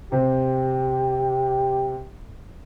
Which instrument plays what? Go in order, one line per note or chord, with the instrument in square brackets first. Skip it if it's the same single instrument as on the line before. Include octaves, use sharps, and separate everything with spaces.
[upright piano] C3 C4 C5 [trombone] G4